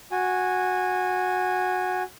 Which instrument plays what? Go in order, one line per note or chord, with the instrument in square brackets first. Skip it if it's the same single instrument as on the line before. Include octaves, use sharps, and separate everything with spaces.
[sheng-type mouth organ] F#4 G#5